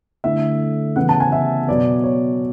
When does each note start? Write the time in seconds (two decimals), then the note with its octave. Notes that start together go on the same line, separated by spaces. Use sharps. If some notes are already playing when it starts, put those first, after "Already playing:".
0.24 D3 A3 E4 E5
0.96 C#3 E3 B3 E4 F#5
1.09 A5
1.20 G#5
1.32 E5
1.68 B2 F#3 B3 D5
2.04 C#5